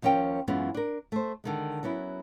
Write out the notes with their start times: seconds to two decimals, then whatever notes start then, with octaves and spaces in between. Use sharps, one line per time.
0.02 D#2 F3 C#4 A#4 G5
0.48 F#2 E3 G#3 B3 C#4 F4
0.74 D4 A#4
1.12 A3 C5
1.44 D3 D#3 G#3
1.83 F#3 B3 C#4 E4